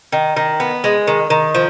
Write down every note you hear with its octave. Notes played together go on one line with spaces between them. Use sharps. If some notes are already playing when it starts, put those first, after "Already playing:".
D#3
D#3
B3
G#3
D#3
D#3
F3